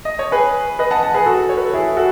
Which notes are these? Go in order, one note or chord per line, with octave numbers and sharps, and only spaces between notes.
D#5
C#5
G#4 B4
B4 D#5
F#5 A5
F#5 A5
G#4 B4
F#4 A4
C#5
B4
A4
E4 G#4
F#4 A4